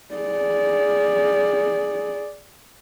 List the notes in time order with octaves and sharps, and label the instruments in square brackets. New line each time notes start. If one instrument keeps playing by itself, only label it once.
[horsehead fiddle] G#4 D5